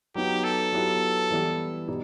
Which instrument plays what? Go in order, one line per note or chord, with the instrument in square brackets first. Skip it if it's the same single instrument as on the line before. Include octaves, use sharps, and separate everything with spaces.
[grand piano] F#3 B3 D#4 [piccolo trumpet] G4
[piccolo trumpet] A4
[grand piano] F#3 B3 E4 G4
E3 G3 B3 E4 G4
B2 G3 D#4 G4